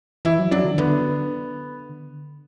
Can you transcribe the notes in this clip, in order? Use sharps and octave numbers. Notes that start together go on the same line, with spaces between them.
E3 E4
F#3
F#3 D4
D3
D3 B3